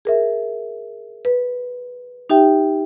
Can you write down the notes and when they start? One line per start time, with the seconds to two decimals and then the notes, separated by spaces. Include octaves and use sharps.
0.05 G#4 A#4 E5
1.25 B4
2.30 D#4 G4 E5 G5